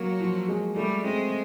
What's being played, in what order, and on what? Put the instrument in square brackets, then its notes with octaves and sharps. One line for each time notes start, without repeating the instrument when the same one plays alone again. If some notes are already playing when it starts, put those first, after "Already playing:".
Already playing: [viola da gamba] F#3 [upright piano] A#3
[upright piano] F3
G#3
[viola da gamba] G3 [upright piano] A3
[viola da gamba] G#3 [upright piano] C4